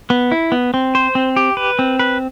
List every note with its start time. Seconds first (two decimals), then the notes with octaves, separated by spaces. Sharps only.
0.10 B3
0.32 E4
0.52 B3
0.74 C4
0.95 C5
1.15 C4
1.36 G4
1.57 B4
1.79 C4
1.99 B4